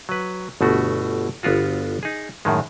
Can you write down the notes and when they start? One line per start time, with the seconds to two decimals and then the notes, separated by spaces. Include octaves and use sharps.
0.09 F#3 B4
0.61 G1 B2 A3 F#4
1.43 G1 B3 F4 F#4
2.03 D#4 G#4
2.45 F#2 A2 D#3 G#3